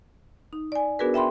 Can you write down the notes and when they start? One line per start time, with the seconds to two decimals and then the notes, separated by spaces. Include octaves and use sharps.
0.53 D#4
0.72 D5 G#5
0.99 B3 D4 F#4 G#4 A#4 B4
1.14 E5 G5 B5 C6